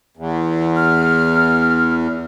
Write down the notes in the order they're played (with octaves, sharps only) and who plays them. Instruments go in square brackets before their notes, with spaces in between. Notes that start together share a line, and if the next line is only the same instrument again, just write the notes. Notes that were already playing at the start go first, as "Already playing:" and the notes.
[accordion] E2
[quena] F6